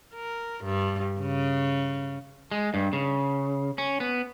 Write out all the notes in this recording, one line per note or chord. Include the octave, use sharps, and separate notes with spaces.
A#4
G2
C#3
G#3
G2
C#3
C#4
B3